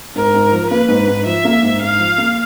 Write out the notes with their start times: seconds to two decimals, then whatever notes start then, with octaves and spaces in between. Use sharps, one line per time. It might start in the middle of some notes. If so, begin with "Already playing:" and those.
0.15 G#2 A#4
0.34 G#2
0.52 F3
0.70 A#3 B4
0.88 G#2
1.08 G#2
1.26 F3 E5
1.45 A#3
1.63 G#2
1.81 G#2 F5
1.99 F3
2.18 A#3